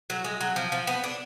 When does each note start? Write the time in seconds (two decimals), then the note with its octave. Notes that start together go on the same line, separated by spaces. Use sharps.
0.10 F#3
0.24 G#3
0.41 F#3
0.56 F3
0.72 F3
0.87 B3
1.04 D4